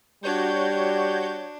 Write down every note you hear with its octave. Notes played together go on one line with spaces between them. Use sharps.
G3 D4 F#4 C#5 G6